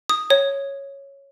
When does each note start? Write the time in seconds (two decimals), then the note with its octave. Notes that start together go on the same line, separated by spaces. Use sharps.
0.09 D#6
0.30 C#5